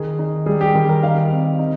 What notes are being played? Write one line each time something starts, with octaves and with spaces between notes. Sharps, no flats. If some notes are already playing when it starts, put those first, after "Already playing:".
Already playing: D#3 G#4
D#4
G3 G#4
G4
D#3
A#4
D#4 F5
C4
D#4